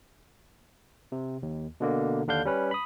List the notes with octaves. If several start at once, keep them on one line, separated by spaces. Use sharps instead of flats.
C3
D#2
B2 D3 A#3
D#2 D3 D4 F5 G6
G3 C#4 B4
B5 D#6